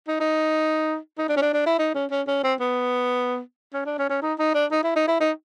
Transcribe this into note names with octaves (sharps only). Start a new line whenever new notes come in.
D#4
D#4
D#4
D4
C#4
D4
D4
E4
D#4
C#4
C#4
C#4
C4
B3
C#4
D4
C#4
C#4
D#4
D#4
D4
D#4
E4
D#4
E4
D#4